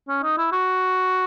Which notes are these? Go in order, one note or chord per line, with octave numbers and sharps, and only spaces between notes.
C#4
D#4
E4
F#4